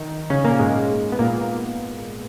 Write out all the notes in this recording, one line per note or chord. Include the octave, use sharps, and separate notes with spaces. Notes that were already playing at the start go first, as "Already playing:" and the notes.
Already playing: D#3 D#4
C#3 C#4
A#2 A#3
A#3
G#2 G#3
B3
A#2 A#3